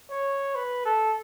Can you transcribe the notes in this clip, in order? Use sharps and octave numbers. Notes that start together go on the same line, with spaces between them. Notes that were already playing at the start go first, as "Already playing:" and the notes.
C#5
B4
A4